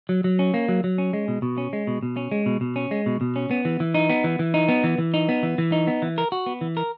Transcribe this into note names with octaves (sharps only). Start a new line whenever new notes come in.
F#3
F#3
C#4
A#3
F#3
F#3
C#4
G#3
B2
B2
C#4
G#3
B2
B2
C#4
G#3
B2
B2
C#4
G#3
B2
B2
C#4
B3
E3
E3
D#4
B3
E3
E3
D#4
B3
E3
E3
D#4
B3
E3
E3
D#4
B3
E3
A#4
F#4
B3
E3
A#4